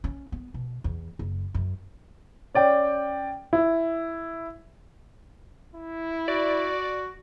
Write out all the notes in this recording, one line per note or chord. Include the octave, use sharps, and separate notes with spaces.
C#4
B3
B2
E2
F#1
F#2
C#4 D5 G5
E4
E4
F#4 D5